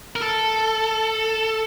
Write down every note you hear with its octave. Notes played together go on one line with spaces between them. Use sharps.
A#4
A4